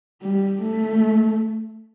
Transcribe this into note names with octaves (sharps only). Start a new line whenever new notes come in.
G3
A3